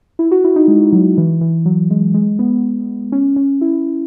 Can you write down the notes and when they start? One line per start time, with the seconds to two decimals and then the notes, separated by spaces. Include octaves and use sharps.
0.19 E4
0.31 F#4
0.44 E4
0.56 D#4
0.68 G#3
0.93 F#3
1.17 E3
1.41 E3
1.65 F#3
1.91 G#3
2.14 G#3
2.39 B3
3.12 C#4
3.36 C#4
3.61 E4